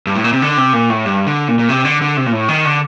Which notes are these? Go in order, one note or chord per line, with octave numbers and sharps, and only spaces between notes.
G2
A2
A#2
C3
D3
C3
A#2
A2
G2
D3
A#2
A#2
C3
D3
D3
C3
A#2
A2
D#3
D3